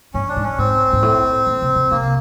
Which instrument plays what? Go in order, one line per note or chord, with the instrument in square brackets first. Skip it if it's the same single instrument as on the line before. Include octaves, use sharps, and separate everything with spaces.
[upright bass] G2 [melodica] C#4
[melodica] D4
[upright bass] G#2
[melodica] C#4
[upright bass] G#2 [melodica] C4
[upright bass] G#2
A2
A#2
C3
C3
[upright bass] C3 [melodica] A#3